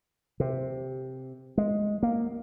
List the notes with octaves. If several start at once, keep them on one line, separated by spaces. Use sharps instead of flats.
C3
G#3
A#3